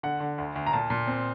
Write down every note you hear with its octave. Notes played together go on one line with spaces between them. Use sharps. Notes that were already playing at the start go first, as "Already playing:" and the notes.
D3 F#5
D3
D2
D2
A#5
A#2 A5
A#2
C4